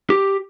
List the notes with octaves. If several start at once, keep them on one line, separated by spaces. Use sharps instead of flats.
G4